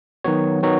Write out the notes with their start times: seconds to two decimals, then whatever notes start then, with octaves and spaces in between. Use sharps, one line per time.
0.24 D#3 F#3 B3 F#4 C#5
0.63 D#3 F#3 B3 F#4 C#5